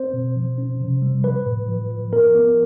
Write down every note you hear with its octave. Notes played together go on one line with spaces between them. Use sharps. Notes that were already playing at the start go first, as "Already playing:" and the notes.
Already playing: C4 C5
B2
F3
C#4
C3
G3
F3 B4
A2
F3
F3
B3 A#4
B3